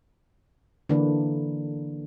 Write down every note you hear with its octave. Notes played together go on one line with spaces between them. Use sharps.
D3 E3 A#3 D4 B4